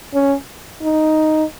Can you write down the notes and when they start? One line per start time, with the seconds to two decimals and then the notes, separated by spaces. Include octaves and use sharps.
0.14 C#4
0.82 D#4